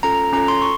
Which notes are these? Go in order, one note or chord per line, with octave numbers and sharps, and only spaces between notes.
C#4 F4 A4 A#5
C#4 F4 A4 A#5
C6
C#6